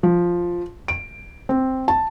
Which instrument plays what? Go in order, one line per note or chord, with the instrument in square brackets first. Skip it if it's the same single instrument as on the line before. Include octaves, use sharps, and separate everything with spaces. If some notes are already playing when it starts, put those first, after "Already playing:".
[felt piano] F3
D7
C4
A5